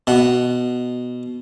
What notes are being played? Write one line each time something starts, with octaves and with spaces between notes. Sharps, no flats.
B2 F#5